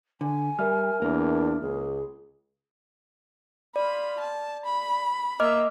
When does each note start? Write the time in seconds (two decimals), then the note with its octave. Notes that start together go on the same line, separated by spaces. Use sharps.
0.21 D3 G#5
0.59 G3 A#4 E5 F6
1.02 E2 A#3 D4
1.61 C#2 G#4
3.76 F4 D5 B5
4.20 A5
4.65 B5
5.40 A#3 D#5 E5 D6 F6